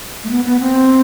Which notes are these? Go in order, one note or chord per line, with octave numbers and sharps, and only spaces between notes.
A3
B3
B3
C4